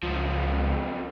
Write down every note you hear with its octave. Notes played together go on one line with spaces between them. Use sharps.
C#2 F#2 F3